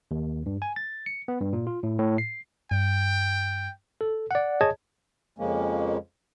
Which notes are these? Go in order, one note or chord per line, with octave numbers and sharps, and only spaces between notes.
D#2
G2
G#5
A6
C#7
B3
G2
A#2
F4
A2
A2
C7
G2 G5
A4
D5 F#5
G#4 C#5 D#5 A5 G#6
F2 C#3 F3 G#3 A#3 C#4